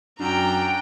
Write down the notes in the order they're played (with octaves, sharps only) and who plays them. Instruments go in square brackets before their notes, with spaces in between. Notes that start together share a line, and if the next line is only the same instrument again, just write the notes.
[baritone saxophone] F#2 [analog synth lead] D4 [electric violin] G5 A#5